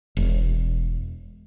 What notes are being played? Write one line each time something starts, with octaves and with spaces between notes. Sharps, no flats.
E1